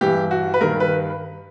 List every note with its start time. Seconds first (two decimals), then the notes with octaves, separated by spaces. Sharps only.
0.01 G2 E3 G4
0.31 F#4
0.54 B4
0.61 G2 D#3 A#4
0.80 B4